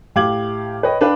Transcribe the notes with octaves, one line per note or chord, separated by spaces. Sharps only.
A2 G4 F5 D6 G#6 F#7
B4 C#5 D#5 G5
D4 B4 F5 G5